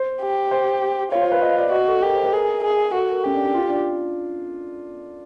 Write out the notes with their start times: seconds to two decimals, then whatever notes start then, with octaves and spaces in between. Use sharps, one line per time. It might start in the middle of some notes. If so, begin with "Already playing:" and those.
Already playing: C5
0.22 G4
0.51 C5
1.12 F4 C#5
1.21 C5
1.32 B4
1.42 D#5
1.58 D5
1.72 F#4 D#5
1.88 A4
2.03 G4 A#4
2.13 C5
2.23 B4
2.33 G#4 A#4
2.64 G#4
2.93 F#4 A4
3.09 A#4
3.24 C#4 G4
3.34 D4
3.45 D4
3.54 F4
3.69 D4